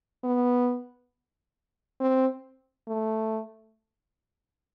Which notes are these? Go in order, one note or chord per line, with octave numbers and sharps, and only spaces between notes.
B3
C4
A3